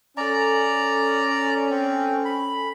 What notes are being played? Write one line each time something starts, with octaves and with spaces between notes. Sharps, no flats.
C#4 A4 D5 G#5 A#5
C4
B5